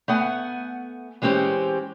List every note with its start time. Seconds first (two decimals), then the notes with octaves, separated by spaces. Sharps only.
0.08 A3 B3 F#5 G#5
1.22 E3 G#3 C4 C#4 G4